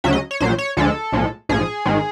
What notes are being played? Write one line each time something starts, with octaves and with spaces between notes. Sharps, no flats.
D2 C#3 F#3 E5
D#5
C#5
A#1 A#2 F#3 C5
C#5
D2 D3 F3 G#3 A4
B1 A2 F3 G#3
A#1 G#2 F3 G#4
G#1 G#2 D#3 G#3